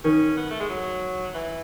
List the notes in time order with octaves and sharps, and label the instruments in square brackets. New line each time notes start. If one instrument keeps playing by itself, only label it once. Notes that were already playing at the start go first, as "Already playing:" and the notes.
[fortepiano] D#3 [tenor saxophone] C#4
[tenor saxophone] B3
A3
G#3
F#3
E3